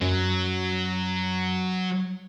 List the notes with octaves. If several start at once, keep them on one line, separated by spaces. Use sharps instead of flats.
F#2 F#3